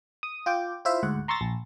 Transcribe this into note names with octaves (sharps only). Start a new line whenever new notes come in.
D#6
F4 G5 D6
E4 F4 C5 E5 F5
D2 G#2 F#5
A#5 C6 C#6 E6 A6 A#6
A#1